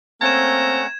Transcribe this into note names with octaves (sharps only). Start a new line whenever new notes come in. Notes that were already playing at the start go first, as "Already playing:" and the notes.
A3 A#3 C4 C#4 F#5 A#5 G#6 E7